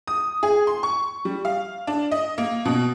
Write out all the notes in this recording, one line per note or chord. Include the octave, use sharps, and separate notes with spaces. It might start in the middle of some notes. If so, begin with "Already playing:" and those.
D#6
G#4
C6
C#6
G3
F5
D4
D#5
A#3
B2